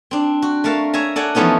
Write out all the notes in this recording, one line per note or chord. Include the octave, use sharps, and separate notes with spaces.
C4 D4
F#4
A3 A#4 F5 A5
C#5 E5 G#5 A#5
A4 D5 F#5 G#5 A#5
E3 F3 A3 B3 C#4 D#4